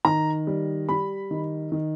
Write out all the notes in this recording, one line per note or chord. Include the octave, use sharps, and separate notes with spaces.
D#3 A#5
G3
G3 B5
D#3
D#3